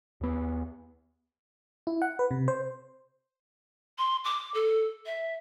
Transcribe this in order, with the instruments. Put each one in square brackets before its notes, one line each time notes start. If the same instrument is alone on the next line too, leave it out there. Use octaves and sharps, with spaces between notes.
[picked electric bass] D#2 B3
[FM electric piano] E4
F#5
B4
C3
C5
[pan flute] C6
D6
A4
E5